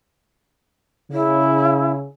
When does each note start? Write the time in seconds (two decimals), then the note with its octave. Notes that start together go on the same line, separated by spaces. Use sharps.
1.12 C#3 E4